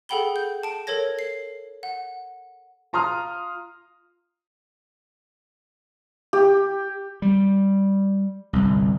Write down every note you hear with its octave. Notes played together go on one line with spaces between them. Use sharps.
G#4 A4 F#5 G5 B5 G7
G6
A5 D7
A4 A#4 C#5 G#6 A#6
C7
F#5
F4 A#5 C6 D#6 F6
G4
G3
G1 C2